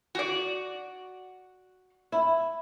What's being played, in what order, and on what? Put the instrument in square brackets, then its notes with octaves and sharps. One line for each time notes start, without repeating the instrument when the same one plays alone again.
[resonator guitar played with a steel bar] F#4 D5
[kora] E4